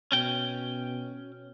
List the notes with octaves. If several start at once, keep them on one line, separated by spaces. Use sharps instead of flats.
B2 C#4 G5